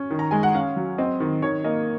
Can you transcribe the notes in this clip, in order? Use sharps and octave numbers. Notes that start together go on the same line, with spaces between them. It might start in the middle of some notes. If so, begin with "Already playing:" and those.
Already playing: C#4
D#3
A#5
G#3 G#5
F#5
C#4 F5
F#3
C4 D#5
D#3
D#3 C#5
A#3 D#5